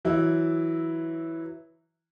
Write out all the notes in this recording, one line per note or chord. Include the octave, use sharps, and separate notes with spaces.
E3 F#3 E4